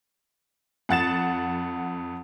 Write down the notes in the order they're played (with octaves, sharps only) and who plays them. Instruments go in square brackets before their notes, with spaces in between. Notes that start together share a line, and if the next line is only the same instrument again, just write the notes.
[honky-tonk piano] F2 F#5 A6 E7